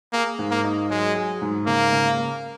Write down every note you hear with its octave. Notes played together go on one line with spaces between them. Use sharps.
A#3 G#4
G#2
A#3
D#4
F#3 G#3
G#4
G#2
C#3 A#3
C#3
A#3